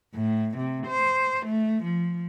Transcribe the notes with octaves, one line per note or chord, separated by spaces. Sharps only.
A2
C3
C5
A3
F3